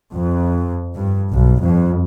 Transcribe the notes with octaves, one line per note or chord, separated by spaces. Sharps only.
F2
G2
B1
F2